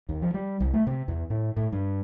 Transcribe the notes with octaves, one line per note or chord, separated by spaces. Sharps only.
D#2
F3
G3
C2
A3
C3
E2
A2
A2
G2